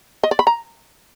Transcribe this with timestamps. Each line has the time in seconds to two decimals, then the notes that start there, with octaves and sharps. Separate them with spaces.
0.23 D#5
0.31 D5
0.39 B5
0.47 A#5